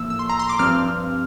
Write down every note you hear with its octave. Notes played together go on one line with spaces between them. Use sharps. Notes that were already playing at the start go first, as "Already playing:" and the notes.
Already playing: A2 F3 A#3 E6
E6
C6
A#5
C6
D6
G2 F3 C4 F6